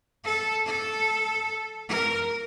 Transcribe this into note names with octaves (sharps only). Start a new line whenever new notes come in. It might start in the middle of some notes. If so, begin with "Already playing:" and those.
A4
A4
A#4